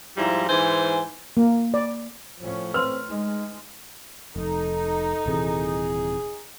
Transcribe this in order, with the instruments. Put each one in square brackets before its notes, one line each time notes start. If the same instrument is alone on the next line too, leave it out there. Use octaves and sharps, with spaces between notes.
[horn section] G#2 F3 G3 E4 A#5
G#2 E3 C5 G#5
[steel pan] A#3
D5
[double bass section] A2 C#4 [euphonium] F3
[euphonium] C4 [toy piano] B4 C6 [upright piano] F6
[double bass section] G#3 [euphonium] D#4
[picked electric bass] F1 [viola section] D#4 [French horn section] A4
[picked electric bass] D#1 C3 E3 [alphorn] G#4